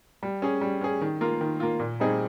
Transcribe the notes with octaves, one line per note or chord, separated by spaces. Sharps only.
G3
C#4 G#4
G3
C#4 G#4
D#3
A#3 F4
D#3
A#3 F4
A#2
G3 C4 D#4 G#4